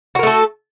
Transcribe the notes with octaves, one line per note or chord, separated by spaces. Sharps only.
A3 F#4 A4 A#4